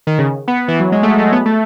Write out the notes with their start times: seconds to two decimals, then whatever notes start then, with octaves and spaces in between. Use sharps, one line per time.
0.07 D#3
0.18 C#3
0.48 B3
0.68 E3
0.80 F#3
0.92 G#3
1.03 A3
1.18 G#3
1.32 B3
1.45 A3